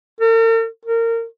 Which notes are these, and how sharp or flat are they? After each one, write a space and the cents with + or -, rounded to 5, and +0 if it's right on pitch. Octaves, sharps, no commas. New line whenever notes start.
A#4 -45
A#4 -25